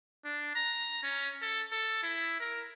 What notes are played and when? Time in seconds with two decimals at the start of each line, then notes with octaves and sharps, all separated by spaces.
0.25 D4
0.55 A#5
1.03 C#4
1.42 A4
1.72 A4
2.03 E4
2.40 A#4